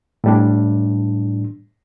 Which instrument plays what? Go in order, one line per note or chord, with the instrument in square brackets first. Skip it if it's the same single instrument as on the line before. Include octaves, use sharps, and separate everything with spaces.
[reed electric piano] A2 G3 D4